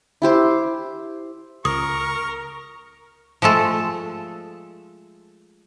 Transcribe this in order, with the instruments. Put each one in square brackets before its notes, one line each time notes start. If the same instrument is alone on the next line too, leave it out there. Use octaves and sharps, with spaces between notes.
[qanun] E4 G4 C5
[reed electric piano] C#2 [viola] A#4 [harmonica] C#6 [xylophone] D#6
[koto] F3 G#3 A3 A4